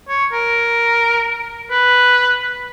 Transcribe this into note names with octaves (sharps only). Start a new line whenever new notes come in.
C#5
A#4
B4